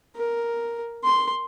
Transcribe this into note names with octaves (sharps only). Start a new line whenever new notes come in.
A#4
C6